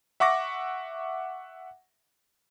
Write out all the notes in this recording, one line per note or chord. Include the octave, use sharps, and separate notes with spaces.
E5 F#5 C#6 D6 A#6